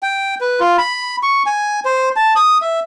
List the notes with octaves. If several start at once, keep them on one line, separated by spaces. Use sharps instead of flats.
G5
B4
F4
B5
C#6
G#5
C5
A5
D#6
E5